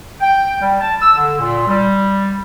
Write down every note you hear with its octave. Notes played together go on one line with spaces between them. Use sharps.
G5
G3
A5
E6
D3
A#2
G3